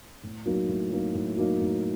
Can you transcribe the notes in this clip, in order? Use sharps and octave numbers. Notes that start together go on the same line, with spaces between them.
A2
F#3 A#3 D#4
A2
F#3 A#3 D#4
A2
F#3 A#3 D#4
A2